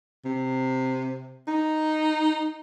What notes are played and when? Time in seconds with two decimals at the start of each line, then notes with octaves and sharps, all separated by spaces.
0.25 C3
1.48 D#4